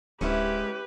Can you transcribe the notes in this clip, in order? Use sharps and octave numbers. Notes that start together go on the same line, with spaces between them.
D1 G#2 C#4 E4 G4 B4